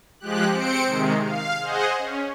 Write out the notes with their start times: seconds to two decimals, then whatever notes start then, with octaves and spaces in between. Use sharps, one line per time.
0.20 F3 G#3 G4 F#6
0.51 C4 C5 C#7 D7
0.85 C3 D#3 G#3
1.23 F5
1.60 G#4 C5 D#5 F#5
1.98 C#4